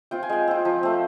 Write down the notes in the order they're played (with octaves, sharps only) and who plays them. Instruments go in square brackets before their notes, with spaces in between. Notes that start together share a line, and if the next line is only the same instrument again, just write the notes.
[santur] C4 F4 G5
G#5
G#3 G5
C4 F4
F3
A3 C4